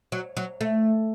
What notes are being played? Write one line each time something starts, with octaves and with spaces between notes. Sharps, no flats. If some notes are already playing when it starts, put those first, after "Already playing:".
F#3
F#3
A3